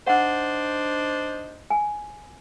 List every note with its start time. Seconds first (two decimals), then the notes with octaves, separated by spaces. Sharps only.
0.07 D4 D#4 C5 F#5
1.70 G#5